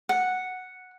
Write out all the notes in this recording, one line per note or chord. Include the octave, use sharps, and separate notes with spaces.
F#5